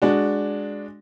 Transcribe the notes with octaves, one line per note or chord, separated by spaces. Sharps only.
G#3 D4 F#4